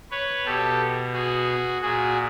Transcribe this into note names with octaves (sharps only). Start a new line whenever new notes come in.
B4 C#5
B2 G4 A4
F#4 G#4
A#2 F#4 G#4